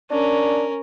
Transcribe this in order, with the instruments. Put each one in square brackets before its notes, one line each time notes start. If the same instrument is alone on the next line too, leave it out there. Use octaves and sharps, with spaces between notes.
[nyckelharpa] C#4 A#4 [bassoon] D4